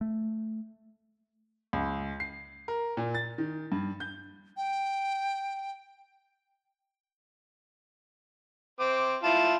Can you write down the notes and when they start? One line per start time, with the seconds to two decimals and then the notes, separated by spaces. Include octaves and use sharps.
0.01 A3
1.73 C#2
2.20 C7
2.68 A#4
2.97 A#2
3.14 A6
3.38 D#3
3.72 G2
4.00 G6
4.57 G5
8.80 C4 D6
9.23 E4 F4 A5